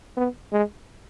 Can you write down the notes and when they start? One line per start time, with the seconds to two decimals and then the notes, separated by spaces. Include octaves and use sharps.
0.17 B3
0.52 G#3